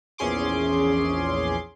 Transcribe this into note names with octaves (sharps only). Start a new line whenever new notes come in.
A#1 E2 C#4 G#4 C6 D6